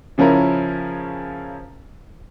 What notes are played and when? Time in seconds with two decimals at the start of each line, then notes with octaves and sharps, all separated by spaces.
0.18 C#3 F3 C#4 E4 A#4